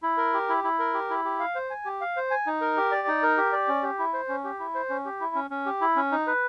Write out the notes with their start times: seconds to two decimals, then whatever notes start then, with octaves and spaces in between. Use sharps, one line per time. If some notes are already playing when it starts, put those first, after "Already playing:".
0.03 E4
0.18 A#4
0.33 G4
0.49 E4
0.64 E4
0.79 A#4
0.94 G4
1.10 E4
1.25 G4
1.40 F5
1.55 C5
1.70 G#5
1.85 G4
2.01 F5
2.16 C5
2.31 G#5
2.47 D#4
2.61 A#4
2.77 G4
2.92 D5
3.08 D#4
3.23 A#4
3.37 G4
3.52 D5
3.68 C#4
3.83 G4
3.99 E4
4.14 C5
4.29 C#4
4.44 G4
4.59 E4
4.75 C5
4.90 C#4
5.05 G4
5.20 E4
5.35 C#4
5.50 C#4
5.66 G4
5.81 E4
5.96 C#4
6.12 D#4
6.27 B4